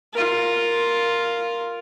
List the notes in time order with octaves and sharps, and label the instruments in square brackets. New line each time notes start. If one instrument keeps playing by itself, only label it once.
[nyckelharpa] F4 A#4